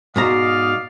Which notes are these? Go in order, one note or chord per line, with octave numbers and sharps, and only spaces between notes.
G#2 B2 D5 D#5 F5 A#5